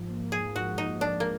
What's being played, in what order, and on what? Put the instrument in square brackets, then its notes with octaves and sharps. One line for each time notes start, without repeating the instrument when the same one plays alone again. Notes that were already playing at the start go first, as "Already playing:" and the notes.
Already playing: [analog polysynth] G#2 F3
A#3
[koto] G#4
[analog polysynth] G#2 [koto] F#4
[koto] D#4
[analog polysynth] G#2 [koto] D4
[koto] A#3